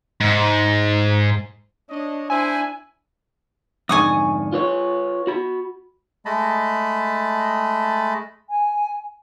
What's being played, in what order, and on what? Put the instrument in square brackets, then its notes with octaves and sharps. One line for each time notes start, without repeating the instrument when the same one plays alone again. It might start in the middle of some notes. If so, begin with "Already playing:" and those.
[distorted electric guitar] G#2
[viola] D4 [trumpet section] C#5 D#5
[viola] D4 [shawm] E4 [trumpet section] C5 [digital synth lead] G#5
[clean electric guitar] F2 G#2 D3 [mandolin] G#5 C#6 D#6
[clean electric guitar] F4 B4 C#5
F#4 B5
[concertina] G#3 A3 D#5 A5 B5
[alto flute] G#5